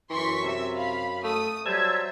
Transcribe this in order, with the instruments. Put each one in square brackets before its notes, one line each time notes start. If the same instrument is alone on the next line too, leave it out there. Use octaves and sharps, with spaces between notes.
[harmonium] F#2 [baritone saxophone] E3 [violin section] C6 C#6 B6
[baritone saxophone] C3 [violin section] E5
[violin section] F5 B5
[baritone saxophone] A3 [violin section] D#6
[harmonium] F#3 C5 [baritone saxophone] G3 [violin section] E5 [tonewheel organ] A5 E6 G#6